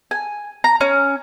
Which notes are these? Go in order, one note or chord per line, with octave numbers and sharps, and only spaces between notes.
G#5
A#5
C#4